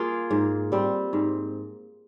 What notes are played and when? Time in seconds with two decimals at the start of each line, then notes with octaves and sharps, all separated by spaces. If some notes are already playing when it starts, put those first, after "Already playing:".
Already playing: A#3 F4 G#4
0.30 G#2
0.72 G3 C4
1.13 G#2